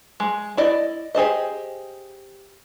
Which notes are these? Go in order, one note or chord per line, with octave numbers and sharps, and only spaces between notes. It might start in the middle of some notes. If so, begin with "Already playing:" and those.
G#3
E4 D5 D#5
G4 G#4 C5 D#5